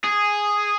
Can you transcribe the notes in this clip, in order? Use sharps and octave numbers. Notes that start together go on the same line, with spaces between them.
G#4